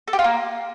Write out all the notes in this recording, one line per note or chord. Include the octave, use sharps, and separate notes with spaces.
A4
G4
F4
A#3